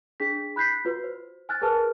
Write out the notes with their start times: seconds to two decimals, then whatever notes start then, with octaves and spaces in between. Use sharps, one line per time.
0.20 D4 G#4 B6
0.56 B5 F#6 G6 B6 C7
0.85 F4 F#4 B4
1.04 C5
1.49 G#5 F6 F#6 A6
1.62 G#4 A#4 B4 A5 F6